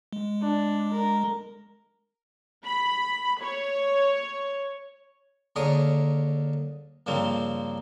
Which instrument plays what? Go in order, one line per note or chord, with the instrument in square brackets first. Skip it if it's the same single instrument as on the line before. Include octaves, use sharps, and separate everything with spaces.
[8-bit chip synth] G#3
[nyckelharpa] D4
A#4
[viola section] B5
C#5
[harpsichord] D#2 D3 G#4 A#4 C#5 D#6
G2 C#3 F3 A#3 C4